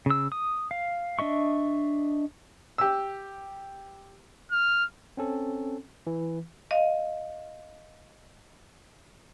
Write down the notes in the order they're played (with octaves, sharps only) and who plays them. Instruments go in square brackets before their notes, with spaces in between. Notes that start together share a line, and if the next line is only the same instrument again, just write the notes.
[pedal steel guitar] C#3 E6
D#6
F5
D4 D#5 E5 C#6
[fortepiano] G4 E6
[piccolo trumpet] F6
[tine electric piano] C4 C#4 A4
E3
[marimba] D#5 F5